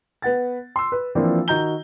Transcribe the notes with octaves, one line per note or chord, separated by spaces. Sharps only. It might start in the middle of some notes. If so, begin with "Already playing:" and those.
B3 B4 F#5 A6
C6 E6
B4
E3 F3 A#3 C4 D4
D#3 F#4 D#5 A#5 G6 G7